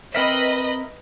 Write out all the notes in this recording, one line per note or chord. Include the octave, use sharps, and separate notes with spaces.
C4 A#4 B4 D#5 E5 B5